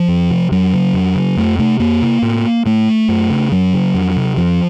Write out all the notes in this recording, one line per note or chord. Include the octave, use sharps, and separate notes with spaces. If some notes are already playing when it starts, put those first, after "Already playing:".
Already playing: F3
F2
C3
F2 F#3
C#3
F2
C#3
F2 A3
C3 A3
F2 A#3
C3
A2
A2 A3
F#2
C#3
F#2 F#3
C#3
F2
C3
F2 F3